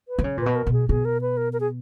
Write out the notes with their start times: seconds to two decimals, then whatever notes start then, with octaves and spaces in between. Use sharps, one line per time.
0.08 B4
0.19 D#3
0.24 C#3 C#5
0.37 A#2 B4
0.46 B2
0.56 A#4
0.67 B2
0.73 G#4
0.89 B2 G#4
1.05 A#4
1.21 B4
1.37 A#4
1.53 A#4
1.60 G#4